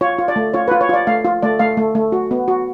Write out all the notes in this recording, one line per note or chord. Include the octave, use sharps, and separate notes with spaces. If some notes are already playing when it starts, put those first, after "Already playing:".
F4 C#5
F4
D5
A3
F4 C#5
F4 B4
C#5
F4 D5
A3 F5
F4
A3 D5
A3 F5
A3
A3
F#4
B3
F#4